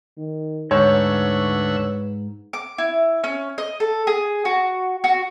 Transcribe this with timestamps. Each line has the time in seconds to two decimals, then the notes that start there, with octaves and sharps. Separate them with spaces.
0.18 D#3
0.71 D2 G#2 B4 C#5 E5 F#5
2.53 D6
2.78 E4
3.24 C#4
3.58 D#5
3.80 A4
4.07 G#4
4.45 F#4
5.04 F#4